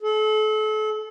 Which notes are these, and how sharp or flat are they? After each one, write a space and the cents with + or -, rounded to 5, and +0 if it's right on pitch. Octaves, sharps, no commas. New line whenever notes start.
A4 -35